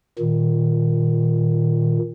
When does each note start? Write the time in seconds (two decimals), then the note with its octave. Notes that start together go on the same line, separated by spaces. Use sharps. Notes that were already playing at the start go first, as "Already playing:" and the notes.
0.19 A#2 D#3